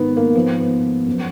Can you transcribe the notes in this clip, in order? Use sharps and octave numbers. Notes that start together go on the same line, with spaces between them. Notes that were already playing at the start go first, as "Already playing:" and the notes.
Already playing: G#2 D#3 B3
A#3
G#2 F3 B3
B3
F#2 F3